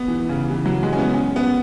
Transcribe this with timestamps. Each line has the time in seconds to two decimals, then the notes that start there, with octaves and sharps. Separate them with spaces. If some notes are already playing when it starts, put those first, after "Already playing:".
Already playing: B3
0.08 E3
0.29 C#3
0.51 E3
0.66 F#3
0.83 G#3
0.93 C#4
0.98 B3
1.14 C#4
1.36 B3